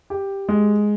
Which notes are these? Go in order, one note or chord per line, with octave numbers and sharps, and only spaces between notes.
G4
G#3